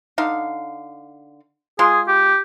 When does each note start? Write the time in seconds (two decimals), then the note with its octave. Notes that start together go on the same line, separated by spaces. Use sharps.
0.18 D3 D#4 F5
1.79 G#3 F4 G#4 C6
2.08 G4